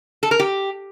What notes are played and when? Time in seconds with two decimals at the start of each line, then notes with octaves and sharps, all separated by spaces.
0.23 A4
0.31 A#4
0.40 G4